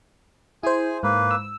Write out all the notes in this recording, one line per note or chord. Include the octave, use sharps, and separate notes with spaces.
E4 G#4 C5 G#5
G#2 A#3 B4
E6